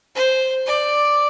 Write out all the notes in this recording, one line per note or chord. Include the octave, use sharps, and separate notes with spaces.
C5
D5